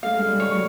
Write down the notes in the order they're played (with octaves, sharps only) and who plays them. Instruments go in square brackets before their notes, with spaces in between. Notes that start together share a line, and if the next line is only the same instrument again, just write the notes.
[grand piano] A3 [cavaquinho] F5
[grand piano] G#3
G3
[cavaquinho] C#5
[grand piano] F#3